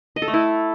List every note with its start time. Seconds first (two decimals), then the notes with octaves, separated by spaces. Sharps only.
0.16 D#5
0.22 A4
0.28 A3
0.34 E4